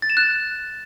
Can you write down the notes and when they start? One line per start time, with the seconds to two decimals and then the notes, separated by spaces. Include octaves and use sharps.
0.02 A6
0.10 E7
0.17 F#6